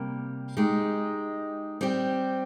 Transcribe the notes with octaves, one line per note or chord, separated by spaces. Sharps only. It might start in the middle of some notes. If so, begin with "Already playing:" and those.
Already playing: C3 G3 A#3
G#3 D#4 G4
G3 C4 G4